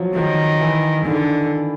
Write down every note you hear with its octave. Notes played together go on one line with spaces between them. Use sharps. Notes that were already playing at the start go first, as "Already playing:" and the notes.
Already playing: F3 F#3
D#3 F3
E3
D3 D#3